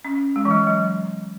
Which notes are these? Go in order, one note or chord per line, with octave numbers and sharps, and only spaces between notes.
C#4
G#3
E3
F#3
F#3